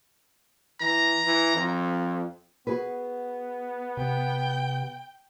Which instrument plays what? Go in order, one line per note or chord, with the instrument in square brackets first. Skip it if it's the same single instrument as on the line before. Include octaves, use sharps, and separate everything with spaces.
[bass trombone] E3 [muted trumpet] A#5
[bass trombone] E3
F2
[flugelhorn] B3 [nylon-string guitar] F#4 G#4 B4
[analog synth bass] C3 [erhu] G5